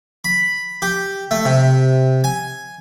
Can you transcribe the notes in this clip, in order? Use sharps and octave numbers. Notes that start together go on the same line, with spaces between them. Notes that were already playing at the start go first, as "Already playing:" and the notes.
B5
G4
A3
C3
G#5